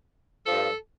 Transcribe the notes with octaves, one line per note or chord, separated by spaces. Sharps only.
G2 F3 A4